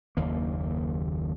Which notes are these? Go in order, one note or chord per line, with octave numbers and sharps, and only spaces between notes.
F#1 D#2 A#3